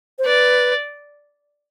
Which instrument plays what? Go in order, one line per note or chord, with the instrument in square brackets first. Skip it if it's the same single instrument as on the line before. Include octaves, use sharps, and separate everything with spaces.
[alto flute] C5
[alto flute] B4 [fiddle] D5